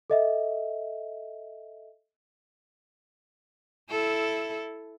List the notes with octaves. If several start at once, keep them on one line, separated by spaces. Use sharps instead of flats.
A4 D#5 E5
E4 A4